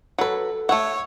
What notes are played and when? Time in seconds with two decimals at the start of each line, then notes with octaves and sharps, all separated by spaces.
0.19 F#3 A4 B4 F#5
0.69 A3 C#5 F#5 C#6 E6